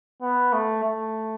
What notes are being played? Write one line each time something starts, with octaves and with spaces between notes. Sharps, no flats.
B3
A3
A3